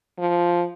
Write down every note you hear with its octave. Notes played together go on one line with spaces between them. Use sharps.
F3